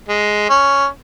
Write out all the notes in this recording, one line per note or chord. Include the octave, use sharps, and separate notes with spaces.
G#3
C#4